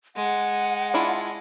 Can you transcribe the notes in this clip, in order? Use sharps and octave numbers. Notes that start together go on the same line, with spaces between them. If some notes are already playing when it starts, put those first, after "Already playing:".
G#3 F#5
D4 E4 F4